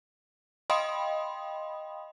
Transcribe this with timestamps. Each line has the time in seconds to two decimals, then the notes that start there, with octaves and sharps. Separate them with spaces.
0.70 D#5 F5 G5 B5 C6 D#6